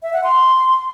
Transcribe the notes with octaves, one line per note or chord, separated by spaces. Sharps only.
E5
F#5
C6